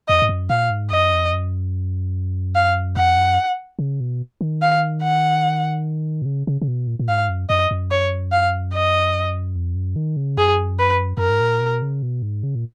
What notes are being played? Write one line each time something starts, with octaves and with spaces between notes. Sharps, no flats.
F2 D#5
G#2
F#2
A#2 F5
G#2
F#2 D#5
F2
F#2
F5
F2 F#5
F#2
C#3
B2
D#3
F5
F#5
B2
C#3
C#3
C#3
B2
A#2
A#2
G#2 F5
F#2
F#2 D#5
F#2
C#5
F5
D#5
F2
F#2
D#3
C#3
F#2 G#4
B4
F#2 A#4
G#2
A#2
B2
C#3
B2
G#2
C#3
A#2